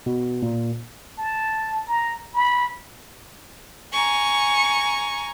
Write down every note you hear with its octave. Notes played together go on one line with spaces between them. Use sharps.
B2
A#2
A5
A#5
B5
G#5 A#5 C#6